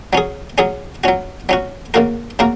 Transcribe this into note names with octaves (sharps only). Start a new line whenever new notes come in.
F#3 C#4 G#4
F#3 C#4 G#4
F#3 C#4 F#4
F#3 C#4 F#4
C#3 A#3 F#4 A#4
C#3 A#3 F#4 A#4